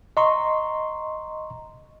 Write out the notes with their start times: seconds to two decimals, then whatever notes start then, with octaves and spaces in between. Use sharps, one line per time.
0.17 D#5 A#5 C6 C#6